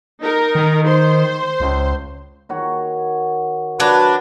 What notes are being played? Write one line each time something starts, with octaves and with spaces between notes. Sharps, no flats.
D#4 A#4
D#3
C5 C6
C#2
D#3 F#4 C#5
F#3 D4 F#4 B4